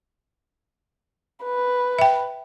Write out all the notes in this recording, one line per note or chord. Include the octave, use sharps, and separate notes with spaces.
B4
E5 G5